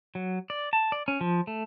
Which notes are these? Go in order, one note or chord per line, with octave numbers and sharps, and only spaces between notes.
F#3
D5
A5
D5
C#4
F3
A3